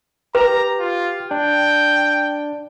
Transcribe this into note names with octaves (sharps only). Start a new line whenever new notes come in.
G4 B4 A#5
F4
D4 G5